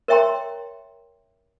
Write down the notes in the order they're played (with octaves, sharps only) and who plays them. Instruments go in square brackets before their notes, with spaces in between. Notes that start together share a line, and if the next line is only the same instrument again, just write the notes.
[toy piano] A#4 C#5 E5 G5 A#5 C6